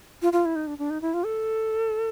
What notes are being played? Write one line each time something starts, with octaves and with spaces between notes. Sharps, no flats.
F4
F4
E4
D#4
D4
D4
D#4
E4
F4
A4